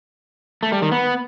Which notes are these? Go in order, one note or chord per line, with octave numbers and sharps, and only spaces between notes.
A3
G3
D#3
B3